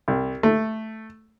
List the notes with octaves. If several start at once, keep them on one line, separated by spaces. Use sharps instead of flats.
C2
A3